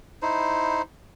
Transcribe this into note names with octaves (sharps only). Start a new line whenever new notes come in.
D#4 E4 C5